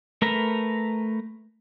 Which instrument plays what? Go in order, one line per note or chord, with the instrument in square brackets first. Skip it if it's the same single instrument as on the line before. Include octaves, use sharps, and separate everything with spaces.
[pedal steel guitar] A3 A#4 B4 A#5